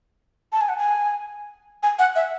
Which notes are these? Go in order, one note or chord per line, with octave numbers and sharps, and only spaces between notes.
A5
G#5
F#5
G#5
G#5
F#5
E5